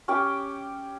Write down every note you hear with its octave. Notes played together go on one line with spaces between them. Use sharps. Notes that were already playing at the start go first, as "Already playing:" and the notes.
C#4 G4 G5 D6